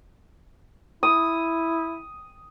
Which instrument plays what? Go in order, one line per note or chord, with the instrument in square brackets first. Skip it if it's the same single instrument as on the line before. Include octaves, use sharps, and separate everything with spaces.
[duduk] E4 [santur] D#6